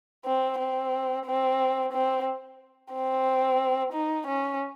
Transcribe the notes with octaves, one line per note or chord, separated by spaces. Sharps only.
C4
C4
C4
C4
C4
D#4
C#4